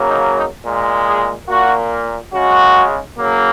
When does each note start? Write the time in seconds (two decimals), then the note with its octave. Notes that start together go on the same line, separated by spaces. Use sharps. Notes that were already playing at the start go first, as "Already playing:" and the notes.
Already playing: C#3 F#3 A#3
0.08 D#4
0.37 D#4
0.65 A#2 G#3
1.07 G#4
1.48 A#2 A#3 F#4
2.33 C#3 G#3 F#4
3.17 C#3 F#3 A#3